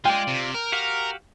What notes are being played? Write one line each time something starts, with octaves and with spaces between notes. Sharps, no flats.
G#3 F4 D5 G5
C3
A#4
F#4 G4 F5